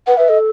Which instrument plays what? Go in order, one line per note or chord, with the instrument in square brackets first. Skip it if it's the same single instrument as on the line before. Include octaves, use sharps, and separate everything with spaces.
[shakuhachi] B4 [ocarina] F#5
[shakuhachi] B4 [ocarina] E5
[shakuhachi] A4 [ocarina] D#5